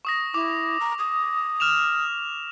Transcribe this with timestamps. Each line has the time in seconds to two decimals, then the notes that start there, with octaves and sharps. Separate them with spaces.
0.05 C#6 D#6 A#6
0.34 E4 D6
0.80 A#5
0.99 D#6
1.60 F6 E7 F7